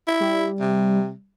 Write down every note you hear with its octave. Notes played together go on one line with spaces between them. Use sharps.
E4
G3
C3